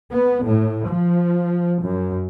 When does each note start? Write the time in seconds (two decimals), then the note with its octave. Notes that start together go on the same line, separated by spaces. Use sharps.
0.12 B3
0.44 A2
0.89 F3
1.82 F#2